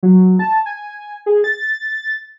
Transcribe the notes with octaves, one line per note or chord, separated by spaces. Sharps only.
F#3
A5
G#5
G#4
A6